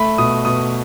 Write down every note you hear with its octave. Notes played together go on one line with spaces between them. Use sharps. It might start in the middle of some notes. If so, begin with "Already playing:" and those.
Already playing: A3 B5
B2 D#6
B2 D#6